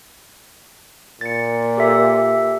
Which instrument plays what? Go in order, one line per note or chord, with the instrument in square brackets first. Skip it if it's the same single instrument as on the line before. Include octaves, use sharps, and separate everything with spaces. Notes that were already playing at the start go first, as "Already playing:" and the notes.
[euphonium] A#2 [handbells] A6 C#7
[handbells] G4 A4 E5